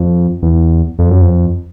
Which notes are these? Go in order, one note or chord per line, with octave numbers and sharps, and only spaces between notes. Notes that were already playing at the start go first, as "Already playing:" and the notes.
Already playing: F2
E2
F2
F#2
F2